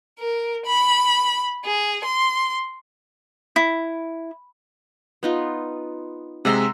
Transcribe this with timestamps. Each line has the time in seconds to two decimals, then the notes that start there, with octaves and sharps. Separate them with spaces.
0.21 A#4
0.66 B5
1.65 G#4
2.05 C6
3.56 E4
5.23 B3 D#4 F4
6.45 C3 G#3 F#5 A#5 C6 E6